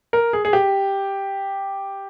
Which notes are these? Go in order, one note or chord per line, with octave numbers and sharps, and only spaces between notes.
A#4
G#4
G#4
G4